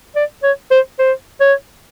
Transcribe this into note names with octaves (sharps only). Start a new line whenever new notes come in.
D5
C#5
C5
C5
C#5